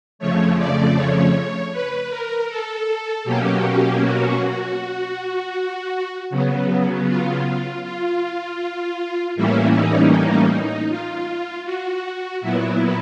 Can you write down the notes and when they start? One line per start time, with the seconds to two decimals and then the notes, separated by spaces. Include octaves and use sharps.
0.19 F2 C#3 F3 A3 C#5
0.57 D5
0.95 C#5
1.72 B4
2.10 A#4
2.48 A4
3.24 B2 F#3 A#3 C#4 G4
4.01 F#4
6.30 C#3 F#3 B3
7.07 F4
7.83 F4
9.36 A2 E3 G3 A#3 C#4 E4
9.75 D#4
10.12 D#4
10.89 F4
11.65 F#4
12.41 A#2 F#3 B3 E4